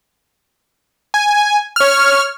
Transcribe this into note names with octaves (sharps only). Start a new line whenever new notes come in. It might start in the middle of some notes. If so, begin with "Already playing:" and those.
G#5
C#5 F6